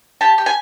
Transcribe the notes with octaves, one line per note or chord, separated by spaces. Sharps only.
G4 A5
G4
G#5